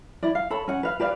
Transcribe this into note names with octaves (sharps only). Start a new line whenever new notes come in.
E4 D5
F5
A4 C#5 B5
C#4 F#5
B4 F5
G4 B4 D5 F5